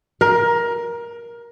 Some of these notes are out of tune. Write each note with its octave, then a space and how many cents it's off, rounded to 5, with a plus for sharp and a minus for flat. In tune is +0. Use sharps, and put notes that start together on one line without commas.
A#4 +20